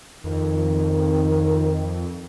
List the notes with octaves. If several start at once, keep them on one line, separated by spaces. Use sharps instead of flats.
F2 D#3